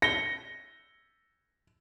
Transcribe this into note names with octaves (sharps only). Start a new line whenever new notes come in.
A#6 C#7 G7